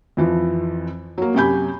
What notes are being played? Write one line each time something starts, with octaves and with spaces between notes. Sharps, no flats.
F2 E3 F3
F#3 A#3
F#2 C3 G4 G#5 B5 G6